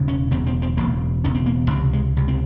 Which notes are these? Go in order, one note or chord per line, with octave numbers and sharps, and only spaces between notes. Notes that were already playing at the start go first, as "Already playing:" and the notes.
Already playing: E1 E2 C#3
C#4
E1 E2 C#3 C4
C4
C4
E1 E2 C#3 A#3
E1 E2 C#3 C#4
C4
A#3
C#2 C3 C4
G#3
C#2 C3
C4